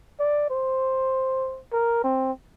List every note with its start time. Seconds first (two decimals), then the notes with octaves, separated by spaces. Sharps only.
0.20 D5
0.50 C5
1.73 A#4
2.04 C4